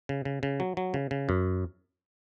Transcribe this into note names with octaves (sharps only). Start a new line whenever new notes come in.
C#3
C#3
C#3
F#3
F#3
C#3
C#3
F#2